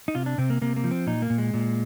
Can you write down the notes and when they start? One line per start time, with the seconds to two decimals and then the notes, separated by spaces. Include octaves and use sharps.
0.08 D#4
0.15 C3 F4
0.26 D4
0.38 C3 C4
0.50 A#3
0.61 C3 A#3
0.76 A#3
0.84 F3
0.91 C4
1.07 A#2 D#4
1.22 A#3
1.30 A#2
1.38 G#3
1.54 A#2